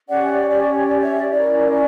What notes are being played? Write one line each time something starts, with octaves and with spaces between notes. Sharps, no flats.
C#4 G4 C#5 D5 F#5
E5
D5
D5
C#5
D5
C#5 E5
D5
C#4 E4 A#4 C#5 D5